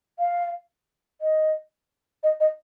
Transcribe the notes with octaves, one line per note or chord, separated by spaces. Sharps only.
F5
D#5
D#5
D#5